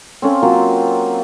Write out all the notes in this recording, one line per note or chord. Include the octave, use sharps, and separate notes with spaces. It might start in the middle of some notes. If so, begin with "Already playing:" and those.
C4 C#4 A4 F5
F#3 A#3 C4 F4